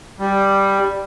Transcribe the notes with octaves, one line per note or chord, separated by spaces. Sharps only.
G3